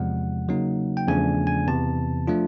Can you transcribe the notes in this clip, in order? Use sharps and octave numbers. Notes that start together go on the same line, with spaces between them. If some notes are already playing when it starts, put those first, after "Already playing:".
Already playing: E2 C3 F3 G#3 F#5
C#3 F#3 A#3 D#4
G5
E2 C#3 F3 A3 D4 G#5
G#5
E2 C3 E3 A5
F3 A3 D4 F4